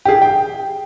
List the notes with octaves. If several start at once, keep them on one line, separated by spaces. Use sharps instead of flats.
G4 G#4
G5